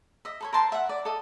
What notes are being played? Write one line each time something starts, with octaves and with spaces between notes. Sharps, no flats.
D#5 E5
A4 B4 C#5
A#4 C5 A5 C6
E5 F#5
D5
A4 D#5